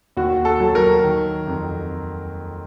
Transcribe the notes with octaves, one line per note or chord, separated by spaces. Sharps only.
D#2 F#4
A4
F#3
A#4
D#3
F2